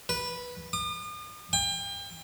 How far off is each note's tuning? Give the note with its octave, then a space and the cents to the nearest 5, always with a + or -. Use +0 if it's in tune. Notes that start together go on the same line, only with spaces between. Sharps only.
B4 -10
D#6 -45
G5 +35